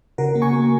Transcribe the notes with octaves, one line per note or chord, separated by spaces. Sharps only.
C#3 F#4 A#4
A#3
G#5 C#6
A#3